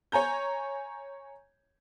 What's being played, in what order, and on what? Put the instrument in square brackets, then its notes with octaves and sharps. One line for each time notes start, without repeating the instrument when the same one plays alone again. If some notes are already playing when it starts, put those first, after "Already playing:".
[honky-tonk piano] C#5 G#5 A#5 G6